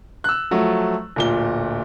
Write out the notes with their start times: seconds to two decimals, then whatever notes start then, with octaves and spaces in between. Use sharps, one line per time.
0.24 E6 F#6
0.51 F3 F#3 A3
1.16 D1 A#2 G7